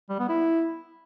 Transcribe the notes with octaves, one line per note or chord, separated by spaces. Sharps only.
G3
B3
E4